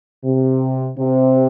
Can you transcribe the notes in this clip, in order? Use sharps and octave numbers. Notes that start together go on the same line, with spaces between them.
C3
C3